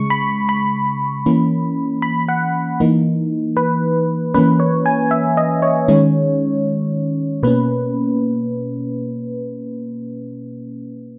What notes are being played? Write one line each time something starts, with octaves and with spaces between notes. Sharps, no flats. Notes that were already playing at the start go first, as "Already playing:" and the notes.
Already playing: C#3 G#3 C#6
B5
B5
E3 A#3 C#4
B5
F#5
E3 A#3 D#4
B4
E3 A#3 C#4 B4
C#5
G#5
E5
D#5
C#5
D#3 G#3 C#4
B2 A#3 C#4 B4